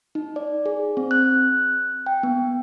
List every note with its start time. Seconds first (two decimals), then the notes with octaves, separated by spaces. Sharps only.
0.15 D#4
0.36 D5
0.66 G#4
0.97 C4
1.11 F#6
2.06 G5
2.23 B3